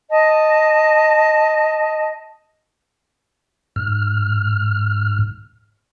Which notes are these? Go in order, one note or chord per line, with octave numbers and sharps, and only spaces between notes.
D#5 A5
G#2 F6